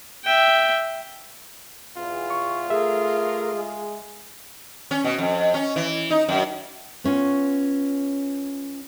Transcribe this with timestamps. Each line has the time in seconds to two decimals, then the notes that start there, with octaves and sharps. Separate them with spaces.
0.24 E5 G5
1.97 E2 F4
2.30 C#6
2.70 A3 G#4 A#4 E5
3.53 G#3
4.91 C#4
5.04 B2
5.18 F2
5.54 C#4
5.76 E3
6.10 D#4
6.28 F#2
7.04 B3 C#4 F4 C#5